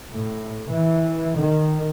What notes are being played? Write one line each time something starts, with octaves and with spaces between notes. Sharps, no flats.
A2
E3
D#3